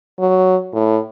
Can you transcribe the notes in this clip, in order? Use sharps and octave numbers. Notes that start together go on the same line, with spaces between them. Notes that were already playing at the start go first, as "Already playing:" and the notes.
F#3
A2